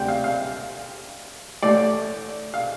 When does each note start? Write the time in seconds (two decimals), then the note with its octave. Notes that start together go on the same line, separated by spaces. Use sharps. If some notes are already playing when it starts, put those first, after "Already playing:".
Already playing: D2 C3 G3 C4 G5
0.08 F5
0.24 F5
1.63 A1 A2 A3 D5
2.54 F5